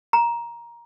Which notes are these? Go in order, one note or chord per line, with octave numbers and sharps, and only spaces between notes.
A#5